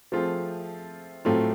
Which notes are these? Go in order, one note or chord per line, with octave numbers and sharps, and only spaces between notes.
F3 A3 C4 F4 G#4
A2 F#3 A3 C4 F4